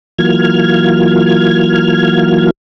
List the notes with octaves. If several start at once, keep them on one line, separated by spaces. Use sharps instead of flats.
E3 F#3 A#3 F4 F6 G#6